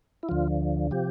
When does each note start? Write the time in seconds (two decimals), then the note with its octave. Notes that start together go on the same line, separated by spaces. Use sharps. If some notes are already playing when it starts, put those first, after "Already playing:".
0.23 E4
0.29 D2 D3 F3 F4
0.91 C3 F3 G4